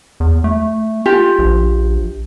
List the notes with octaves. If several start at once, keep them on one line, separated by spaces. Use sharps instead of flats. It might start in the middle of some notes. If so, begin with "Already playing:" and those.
E2
A3
F4 G4
A#1